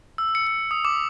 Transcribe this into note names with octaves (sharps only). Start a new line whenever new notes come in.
E6
C#7
C#7
D#6
D6